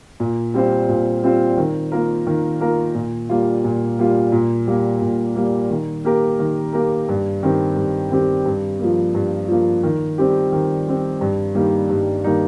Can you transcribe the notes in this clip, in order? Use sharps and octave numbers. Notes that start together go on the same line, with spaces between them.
A#2
G3 C4 F4 C5
A#2
G3 C4 F4 C5
D#3
A#3 F4 A#4
D#3
A#3 F4 A#4
A#2
G3 A#3 F4
A#2
G3 A#3 F4
A#2
G3 A#3
A#2
G3 A#3
D#3
A#3 G4 A#4
D#3
A#3 G4 A#4
G2
D#3 C4 G4
G2
D#3 C4 G4
G2
F3 A#3
G2
F3 A#3
D#3
G3 C4 G4
D#3
G3 C4 G4
G2
D#3 G3 A#3 D#4
G2
D#3 G3 A#3 D#4